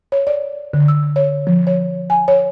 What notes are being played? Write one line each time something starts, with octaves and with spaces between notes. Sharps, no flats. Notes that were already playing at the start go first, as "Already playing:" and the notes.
C#5
D5
D3
E6
C#5
F3
C#5
G#5
C#5